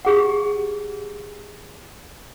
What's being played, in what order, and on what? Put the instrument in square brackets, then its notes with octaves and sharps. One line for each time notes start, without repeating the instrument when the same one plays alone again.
[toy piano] G4 G#4 F#5